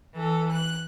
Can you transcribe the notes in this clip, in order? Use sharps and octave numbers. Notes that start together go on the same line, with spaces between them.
E3 A4
F#6